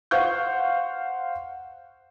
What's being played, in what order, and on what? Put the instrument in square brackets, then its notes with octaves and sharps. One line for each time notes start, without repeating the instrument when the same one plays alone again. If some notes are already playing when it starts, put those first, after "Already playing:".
[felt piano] C5 F5 F#5 C#6 G6